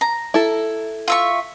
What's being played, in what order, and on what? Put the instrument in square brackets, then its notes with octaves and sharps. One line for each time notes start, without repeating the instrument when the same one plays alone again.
[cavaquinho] A#5
[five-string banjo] E4 A4
[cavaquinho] F4 E5 C#6